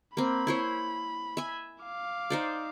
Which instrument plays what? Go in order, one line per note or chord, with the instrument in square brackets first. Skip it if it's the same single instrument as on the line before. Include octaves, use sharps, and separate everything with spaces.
[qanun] A#3 C4 [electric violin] B5
[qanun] E4 C5 C#5
E5 G#5
[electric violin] F5 D6
[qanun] D#4 C5 D5